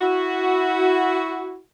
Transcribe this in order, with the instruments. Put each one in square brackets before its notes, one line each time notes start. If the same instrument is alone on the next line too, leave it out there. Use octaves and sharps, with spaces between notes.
[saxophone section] E4 F#4